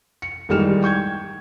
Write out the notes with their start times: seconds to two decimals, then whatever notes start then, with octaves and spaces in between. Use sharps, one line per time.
0.22 C#7
0.49 A1 D#3 G3 G#3 F6 E7
0.82 G5 C#6 G6 G#6